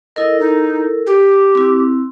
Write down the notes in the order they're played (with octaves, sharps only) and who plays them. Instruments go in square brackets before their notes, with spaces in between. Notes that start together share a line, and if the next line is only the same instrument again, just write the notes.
[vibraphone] E4 A4 A#4 [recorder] D#5
[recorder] D#4
G4
[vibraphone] C4 E4